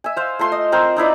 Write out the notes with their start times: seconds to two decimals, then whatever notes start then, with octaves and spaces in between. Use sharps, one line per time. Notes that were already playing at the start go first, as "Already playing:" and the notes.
0.04 E5 G#5
0.17 C5 F5
0.39 A3 F4 C6
0.52 D#5
0.72 C4 A#4 C5
0.97 D#4 E4 B4 D5